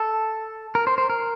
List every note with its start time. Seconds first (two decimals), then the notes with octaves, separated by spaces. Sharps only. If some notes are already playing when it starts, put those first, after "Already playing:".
Already playing: A4
0.75 A#4
0.87 C5
0.98 C5
1.10 A#4